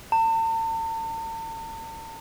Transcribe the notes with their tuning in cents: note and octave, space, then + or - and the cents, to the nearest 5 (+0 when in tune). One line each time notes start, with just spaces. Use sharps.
A5 +45